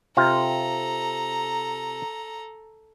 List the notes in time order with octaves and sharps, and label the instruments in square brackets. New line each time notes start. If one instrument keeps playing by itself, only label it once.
[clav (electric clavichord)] C3 F4 [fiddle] A4 A#5